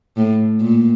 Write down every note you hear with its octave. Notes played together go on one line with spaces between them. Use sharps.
A2
A#2